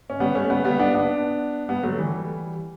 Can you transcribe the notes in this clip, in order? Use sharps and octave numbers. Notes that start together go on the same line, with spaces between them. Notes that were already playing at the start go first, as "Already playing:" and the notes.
C#4
G3 B3
A3 C#4
G3 B3
G3 B3
B3 D4
B3 D4
G3 B3
F#3 A3
E3 G3